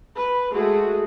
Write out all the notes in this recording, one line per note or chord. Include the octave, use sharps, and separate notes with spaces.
B4
G#3 A3 F#4 G#4